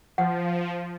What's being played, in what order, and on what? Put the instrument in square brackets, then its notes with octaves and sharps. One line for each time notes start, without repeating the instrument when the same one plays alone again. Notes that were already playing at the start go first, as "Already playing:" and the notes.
[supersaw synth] F3 [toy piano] F#5